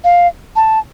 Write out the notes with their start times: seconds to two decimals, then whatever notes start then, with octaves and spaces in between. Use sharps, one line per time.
0.04 F5
0.56 A5